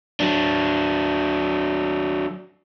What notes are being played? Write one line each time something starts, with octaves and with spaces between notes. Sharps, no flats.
F#3 D4